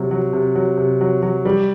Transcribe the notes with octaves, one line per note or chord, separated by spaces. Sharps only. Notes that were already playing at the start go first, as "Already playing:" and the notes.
Already playing: C3 F#3
F#3
C3
F#3
C3
F#3
F#3
G3